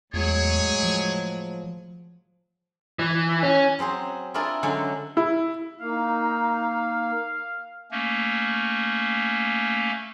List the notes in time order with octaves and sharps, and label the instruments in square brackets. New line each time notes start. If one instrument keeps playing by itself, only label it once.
[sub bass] E2 [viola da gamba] A2 F#3 G#3 [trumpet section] G#4 C#5
[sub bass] F3
[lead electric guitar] E3
C#4
[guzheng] F#3 C4 G#4 C5
D4 E4 F4 G#4 A#4 D5
D3 F#3 G#3 C#4 A4
[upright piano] E4
[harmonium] A#3 [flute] D#4 [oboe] F5
[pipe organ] A3 A#3 C#4